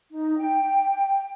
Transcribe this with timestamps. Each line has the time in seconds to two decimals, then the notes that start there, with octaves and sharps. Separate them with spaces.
0.13 D#4
0.38 G5